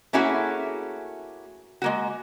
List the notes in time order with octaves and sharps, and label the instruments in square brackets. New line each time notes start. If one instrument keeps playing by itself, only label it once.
[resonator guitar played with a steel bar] A3 A#3 C#4 E4 F#4 G#4
G#3 A#3 F#4